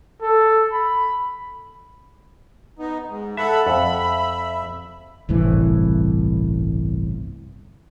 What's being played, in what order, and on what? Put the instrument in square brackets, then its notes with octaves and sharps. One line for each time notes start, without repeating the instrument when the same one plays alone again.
[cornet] A4
B5
[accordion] B3 D#4
G#2
[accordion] A4 F#5 [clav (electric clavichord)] E5 [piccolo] B5
[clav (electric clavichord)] F2 [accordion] E5
[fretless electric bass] G1 C2 A2 E3